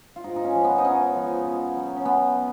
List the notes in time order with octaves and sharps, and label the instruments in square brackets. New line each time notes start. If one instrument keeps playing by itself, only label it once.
[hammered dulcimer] F4
G#2 D#4
D#4
C#4
F3
B3
D#4
G#2 C#4
F3
B2
F#3
C#4
B2 B3
F#3